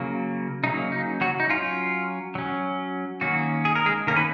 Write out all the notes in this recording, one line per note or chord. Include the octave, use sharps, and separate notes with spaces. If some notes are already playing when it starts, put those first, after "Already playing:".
Already playing: C#3 F#3 A#3
C#3 F#3 A#3 D#4
D#4
F#3 F#4
D#4
F#3 C#4 F4
F#3 C#4
D#3 F#3 A#3 C#4 F#4
G#4
A#4
G#3 G#4
D#3 A#3 C#4 A#4
B4